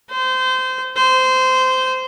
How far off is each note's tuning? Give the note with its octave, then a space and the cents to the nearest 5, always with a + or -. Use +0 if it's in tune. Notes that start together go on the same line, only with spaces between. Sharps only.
C5 -25
C5 -20